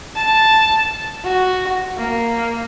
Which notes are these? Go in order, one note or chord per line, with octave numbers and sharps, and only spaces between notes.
A5
F#4
A#3